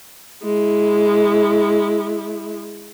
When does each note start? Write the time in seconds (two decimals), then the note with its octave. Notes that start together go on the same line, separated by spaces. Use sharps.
0.43 G#3 E4